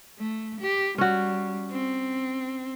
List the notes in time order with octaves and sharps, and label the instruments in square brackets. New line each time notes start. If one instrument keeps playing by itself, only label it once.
[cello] A3
G4
[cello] G3 [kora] C#4 F#4
[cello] C4